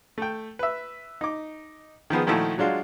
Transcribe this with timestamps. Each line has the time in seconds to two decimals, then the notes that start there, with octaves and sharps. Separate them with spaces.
0.18 A3 G5
0.59 B4 E5
1.21 D#4 D6
2.10 D#3 F3 B3 G#4
2.27 A#2 D#3 F3 A3 E4 F#4
2.58 F#3 G#3 D4 F4 F#4